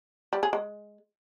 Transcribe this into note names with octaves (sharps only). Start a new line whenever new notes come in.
G3
G#4
G#3